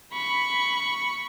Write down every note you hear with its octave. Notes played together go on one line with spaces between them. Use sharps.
B5 C#6